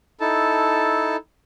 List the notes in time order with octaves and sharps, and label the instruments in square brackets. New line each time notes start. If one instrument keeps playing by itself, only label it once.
[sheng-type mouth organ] D#4 E4 A4 A5